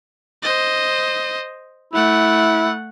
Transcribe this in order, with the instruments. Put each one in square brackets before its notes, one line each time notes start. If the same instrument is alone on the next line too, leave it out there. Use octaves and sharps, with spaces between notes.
[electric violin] C5 D#5
[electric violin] A3 F#5 [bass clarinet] E4